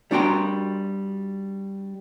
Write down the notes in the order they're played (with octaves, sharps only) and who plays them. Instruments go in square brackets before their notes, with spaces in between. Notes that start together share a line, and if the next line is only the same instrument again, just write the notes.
[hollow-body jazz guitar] G3 D4 F#4 G5 A#5 C6